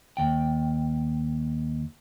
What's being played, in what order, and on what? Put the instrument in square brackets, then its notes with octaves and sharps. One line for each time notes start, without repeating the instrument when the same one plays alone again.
[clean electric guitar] D#2 G5